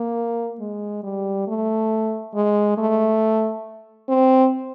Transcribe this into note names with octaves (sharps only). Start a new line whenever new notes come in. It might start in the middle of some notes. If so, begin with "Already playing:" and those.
Already playing: A#3
G#3
G3
A3
G#3
A3
C4